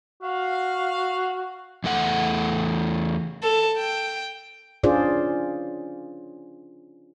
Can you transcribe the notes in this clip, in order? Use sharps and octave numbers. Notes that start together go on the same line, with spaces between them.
F#4 F5
E2 A3 F#5
A4
G5
C#4 D4 F4 G#4 C5 D5